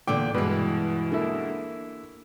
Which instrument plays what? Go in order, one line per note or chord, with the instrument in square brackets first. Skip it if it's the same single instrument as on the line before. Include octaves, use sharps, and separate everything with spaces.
[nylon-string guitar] E2 A#2 D3 [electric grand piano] G5 [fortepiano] D6
[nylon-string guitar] G2 E3 [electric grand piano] B2 G#3 [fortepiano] B4
[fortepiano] D3 E4 [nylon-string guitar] A#3